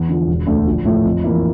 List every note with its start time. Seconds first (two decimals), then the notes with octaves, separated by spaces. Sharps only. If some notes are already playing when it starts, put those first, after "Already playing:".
Already playing: E2
0.09 D3 F3
0.28 E1
0.47 D2 D3 A3 D4
0.67 A#1
0.85 A2 F3 A3
1.05 F2
1.24 E3 A#3 E4